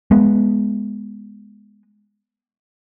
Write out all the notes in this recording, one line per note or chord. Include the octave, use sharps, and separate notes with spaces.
G#3 B3